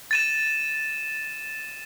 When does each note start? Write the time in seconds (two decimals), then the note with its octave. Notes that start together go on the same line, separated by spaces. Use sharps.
0.11 A6 D#7 E7